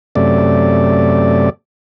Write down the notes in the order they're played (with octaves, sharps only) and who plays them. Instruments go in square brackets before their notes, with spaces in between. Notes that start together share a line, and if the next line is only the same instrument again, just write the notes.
[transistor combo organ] F#2 C3 A3 D5